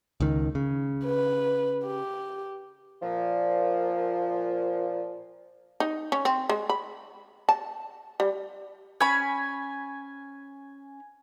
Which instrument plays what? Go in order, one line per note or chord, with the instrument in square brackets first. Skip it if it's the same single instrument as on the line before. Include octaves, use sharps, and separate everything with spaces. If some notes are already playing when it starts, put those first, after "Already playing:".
[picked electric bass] C#2 D#3
C#3
[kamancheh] B4
G4
[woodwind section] A#2 F3
[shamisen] D#4
C#4
C4
G#3
B5
A5
G3
[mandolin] C#4 B5 [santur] G#5